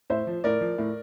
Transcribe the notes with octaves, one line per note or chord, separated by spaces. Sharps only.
A2 C5 E5
F3
A2 A#4 D5
F3
A2